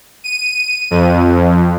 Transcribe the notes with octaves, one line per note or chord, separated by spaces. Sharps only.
D#7
F2